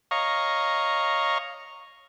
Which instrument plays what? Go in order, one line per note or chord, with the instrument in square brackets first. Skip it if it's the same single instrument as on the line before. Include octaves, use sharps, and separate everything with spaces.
[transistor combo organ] C#5 D#5 F5 A#5 C#6